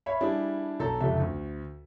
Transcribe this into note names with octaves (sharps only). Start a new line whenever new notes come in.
C#5 E5 F5 B5
G3 D4 E4 G#4
B1 A4 A5 A#5
F1 C#2 G4 A4 E5
D2